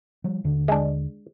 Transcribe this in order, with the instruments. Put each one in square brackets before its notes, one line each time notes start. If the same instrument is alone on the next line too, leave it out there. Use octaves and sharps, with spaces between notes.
[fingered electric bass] F3 G3
D#2 D3
[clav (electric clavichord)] G#3 D4